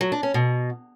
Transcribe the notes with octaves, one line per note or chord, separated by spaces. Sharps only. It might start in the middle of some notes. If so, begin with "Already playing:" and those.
F#3
D4
C#4
B2